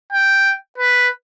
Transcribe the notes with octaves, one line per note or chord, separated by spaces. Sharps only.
G5
B4